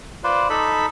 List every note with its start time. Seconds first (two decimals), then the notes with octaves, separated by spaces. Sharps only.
0.24 F4 B4 C5 D5
0.50 D#4 A4 B5